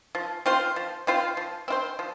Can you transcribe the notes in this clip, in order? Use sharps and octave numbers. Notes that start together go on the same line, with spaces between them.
F3
C4 F4 C5
F3
C4 F4 C5
F3
C4 F4 C5
F3